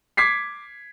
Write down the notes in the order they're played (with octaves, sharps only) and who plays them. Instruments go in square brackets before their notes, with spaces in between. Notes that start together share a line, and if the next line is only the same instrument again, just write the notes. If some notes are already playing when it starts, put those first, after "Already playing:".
[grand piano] D6 G#6 B6 C7